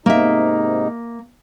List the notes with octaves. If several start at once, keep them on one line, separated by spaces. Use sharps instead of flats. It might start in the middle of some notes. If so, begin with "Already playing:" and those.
G#2 C3 A#3 D#4 E5